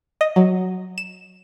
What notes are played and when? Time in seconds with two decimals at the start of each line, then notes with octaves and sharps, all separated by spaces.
0.21 D#5
0.36 F#3
0.98 E7